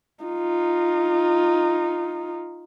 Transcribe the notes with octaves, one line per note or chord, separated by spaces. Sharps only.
D#4 F4